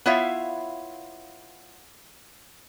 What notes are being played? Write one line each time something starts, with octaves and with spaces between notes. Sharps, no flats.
B3 E4 F4 C#5 E5 F5